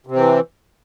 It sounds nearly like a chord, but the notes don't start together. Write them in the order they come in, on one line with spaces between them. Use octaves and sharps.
C3 C4 E3